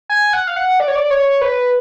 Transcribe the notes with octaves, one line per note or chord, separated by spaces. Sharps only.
G#5
F#5
F5
F#5
D5
C#5
D5
C#5
B4